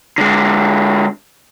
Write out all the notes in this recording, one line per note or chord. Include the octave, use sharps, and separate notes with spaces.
D3 G#3